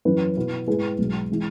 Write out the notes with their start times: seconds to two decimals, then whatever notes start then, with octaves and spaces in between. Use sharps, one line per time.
0.05 F#2 E3 C#4 E4 B4
0.37 B2 B3 E4 B4
0.67 G#2 G#3 E4 G#4 B4
0.98 B1 B2 G#3
1.31 E3 G#3 E4